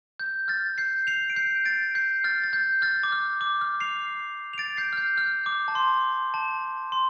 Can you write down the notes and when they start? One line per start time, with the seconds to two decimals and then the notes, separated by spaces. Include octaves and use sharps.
0.20 G6
0.48 F6 A6
0.78 G6 C7
1.07 C7 F7
1.30 D7
1.36 G6 C7
1.65 A6 D7
1.95 G6 C7
2.24 F6 A6
2.44 A6
2.53 G6
2.82 F6 A6
3.03 D6
3.12 F6
3.41 D6
3.61 F6
3.80 C7 F7
4.53 F7
4.58 A6 D7
4.77 G6 C7
4.93 F6
4.97 G6
5.18 F6
5.46 D6
5.68 A5
5.75 C6
6.34 A5
6.92 C6